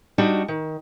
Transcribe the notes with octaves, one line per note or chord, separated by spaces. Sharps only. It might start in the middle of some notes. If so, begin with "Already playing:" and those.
G3 D4 D#4 F#4
D#3